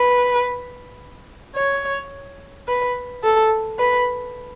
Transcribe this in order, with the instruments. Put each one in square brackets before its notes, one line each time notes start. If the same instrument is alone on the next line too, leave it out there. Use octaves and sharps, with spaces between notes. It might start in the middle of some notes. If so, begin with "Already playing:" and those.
Already playing: [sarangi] B4
C#5
B4
A4
B4